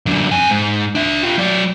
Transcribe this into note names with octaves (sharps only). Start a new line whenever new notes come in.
F#2 D3
F2 G#5
G#2
D4 E5
F4 G4
F#3 D5